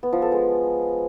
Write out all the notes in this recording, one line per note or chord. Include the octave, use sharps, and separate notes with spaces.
B3
F3
A4
G#3